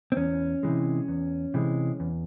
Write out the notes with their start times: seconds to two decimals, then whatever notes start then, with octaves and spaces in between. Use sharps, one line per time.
0.12 C4
0.17 E2 C#4
0.63 C3 E3 G#3
1.08 E2
1.54 C3 E3 G#3
2.00 E2